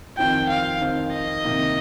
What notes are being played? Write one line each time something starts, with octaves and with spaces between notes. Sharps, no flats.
F2 D#3 C4 F4 G5
F5
F2 D#3 C4 F4
D#5
C3 D#3 A#3